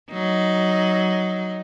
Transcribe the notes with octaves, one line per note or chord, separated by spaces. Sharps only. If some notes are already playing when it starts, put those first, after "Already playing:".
F#3 D#4